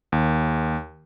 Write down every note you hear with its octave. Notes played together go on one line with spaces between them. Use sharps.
D#2